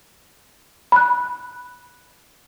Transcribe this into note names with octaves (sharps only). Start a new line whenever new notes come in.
B5 F#6